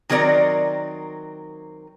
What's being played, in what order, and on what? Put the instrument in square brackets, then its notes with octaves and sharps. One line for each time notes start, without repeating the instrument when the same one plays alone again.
[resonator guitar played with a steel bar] D#3 F#3 C4 A#4 D5